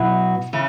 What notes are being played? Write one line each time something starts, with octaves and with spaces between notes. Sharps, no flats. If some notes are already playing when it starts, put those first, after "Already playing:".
Already playing: B2 F#3 B3 E4
C#3 E3